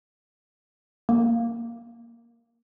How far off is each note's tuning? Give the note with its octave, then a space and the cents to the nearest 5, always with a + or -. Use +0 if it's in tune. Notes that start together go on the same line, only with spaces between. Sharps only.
A#3 +5